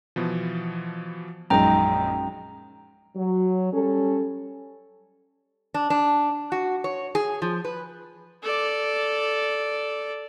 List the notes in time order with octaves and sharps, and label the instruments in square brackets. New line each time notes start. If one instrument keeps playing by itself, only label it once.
[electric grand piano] B2 E3 F3
[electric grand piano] A#1 D#4 [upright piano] F#2 G#3 [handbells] G5 A#5
[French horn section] F#3
G3 C#4 A4
[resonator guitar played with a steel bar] D4
D4
F#4
C#5
G#4
F3
B4
[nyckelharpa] A4 D5